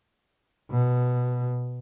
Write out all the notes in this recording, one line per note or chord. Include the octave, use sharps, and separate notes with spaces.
B2